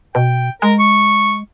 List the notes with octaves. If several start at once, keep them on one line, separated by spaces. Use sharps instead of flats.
B2 G5
G#3 A#4
C#6